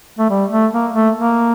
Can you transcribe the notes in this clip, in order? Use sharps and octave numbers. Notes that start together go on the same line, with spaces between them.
A3
G3
A3
A#3
A3
A#3